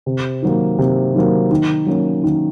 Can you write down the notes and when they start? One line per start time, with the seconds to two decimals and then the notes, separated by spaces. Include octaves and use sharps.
0.06 C3
0.42 D#3 F#3 A#3
0.78 C3
1.15 D#3 F#3 A#3
1.51 D#3
1.86 F#3 A#3 C#4
2.24 D#3